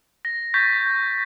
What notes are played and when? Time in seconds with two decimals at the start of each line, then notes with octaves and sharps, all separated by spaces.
0.25 A#6
0.54 C#6 G6 A6 B6